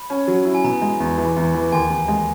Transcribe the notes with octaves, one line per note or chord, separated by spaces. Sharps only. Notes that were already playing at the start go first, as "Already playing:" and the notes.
Already playing: B5
C#4
F#3
E4
G#5
B2 A#5
G#3
E2
E3
E2
E3
D#2 G#5
D#2
G#3